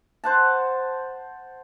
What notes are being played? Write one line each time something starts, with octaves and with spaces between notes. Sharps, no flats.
C5 F#5 A5